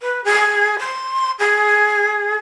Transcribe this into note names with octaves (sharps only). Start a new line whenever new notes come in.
B4
G#4
C6
G#4